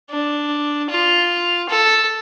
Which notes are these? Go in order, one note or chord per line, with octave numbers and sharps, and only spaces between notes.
D4
F4
A4